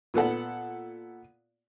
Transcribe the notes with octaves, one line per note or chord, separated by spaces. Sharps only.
A#2 B3 A4 F#5